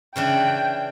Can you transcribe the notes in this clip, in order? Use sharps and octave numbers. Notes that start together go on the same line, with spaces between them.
C#3 E3 D4 G5